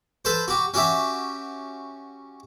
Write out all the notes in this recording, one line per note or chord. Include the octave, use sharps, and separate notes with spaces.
A4 B4 C5
F#4 G4
C#4 F#4 G4 E5